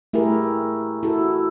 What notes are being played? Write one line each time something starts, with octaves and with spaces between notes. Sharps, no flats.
A3 E4 G4 G#4 A#4
E4 F#4 A4